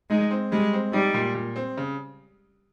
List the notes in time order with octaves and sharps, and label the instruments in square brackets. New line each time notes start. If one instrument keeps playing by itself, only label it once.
[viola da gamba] G#3 [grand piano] D#4
[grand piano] C4
[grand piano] G3 [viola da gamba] G#3
[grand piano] C4
[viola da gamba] G3 [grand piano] D#4
[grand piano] A#2
A#2
C4
C#3